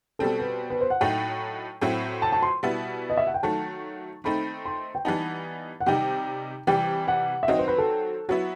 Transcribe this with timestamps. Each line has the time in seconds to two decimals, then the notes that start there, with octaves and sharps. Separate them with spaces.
0.19 B2 G3 C4 A4
0.40 B4
0.70 B4
0.81 C5
0.90 F#5
1.01 A2 F#3 A3 D#4 G5
1.81 A2 F#3 C4 E4
2.22 A5
2.32 A5
2.43 C6
2.63 B2 G3 B3 E4
3.10 D#5
3.17 E5
3.27 F#5
3.34 G5
3.43 D#3 F#3 A3 A5
4.24 D#3 A3 C4 D#4 B5
4.65 C6
4.95 G5
5.05 E3 G3 B3 D#4 A5
5.80 F#5
5.86 C3 D#3 G3 D#4 G5
6.67 C3 E3 G3 G5
7.08 F#5
7.43 E5
7.48 D#3 F#3 C4 D#5
7.59 C5
7.68 B4
7.78 A4
8.29 F#3 B3 E4 F#4